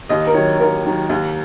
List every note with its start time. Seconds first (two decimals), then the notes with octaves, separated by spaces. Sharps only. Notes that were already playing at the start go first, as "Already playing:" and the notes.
0.09 D#2 D#5
0.27 A#4
0.34 D#3 F#3 C#5
0.60 D#2 A#4
0.84 D#3 F#3
1.09 D#2